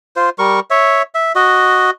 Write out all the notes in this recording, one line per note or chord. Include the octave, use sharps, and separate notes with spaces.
F4 C5
G3 A#4 C#6
C#5 E5
E5
F#4 D#5